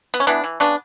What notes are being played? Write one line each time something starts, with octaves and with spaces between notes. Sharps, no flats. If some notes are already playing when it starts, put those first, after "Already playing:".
B3
C#4
E3 B3 D4
E3
C#3 B3 D4